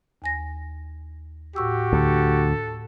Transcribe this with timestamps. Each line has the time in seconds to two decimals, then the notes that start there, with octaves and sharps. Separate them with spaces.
0.22 D#2 G#5 A#6
1.56 A2 F#4 G4 C#6 E6
1.93 D2 A4